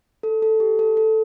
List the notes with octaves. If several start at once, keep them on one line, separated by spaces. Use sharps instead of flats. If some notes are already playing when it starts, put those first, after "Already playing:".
A4
A4
G4
A4
A4